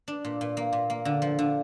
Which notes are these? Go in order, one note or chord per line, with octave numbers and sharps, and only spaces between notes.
D4
A#2
A#2
A#3
A#2
A#3
D3
F3
D3